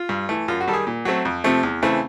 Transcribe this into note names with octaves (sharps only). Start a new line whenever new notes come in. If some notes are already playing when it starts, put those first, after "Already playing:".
Already playing: F4
G2
E3 A3
F#2 F4
F#4
D#3 G3 A4
G#4
A#2
F#3 A3 C4
F2
C3 F3 A3 C4
E2
C#3 E3 A3 C4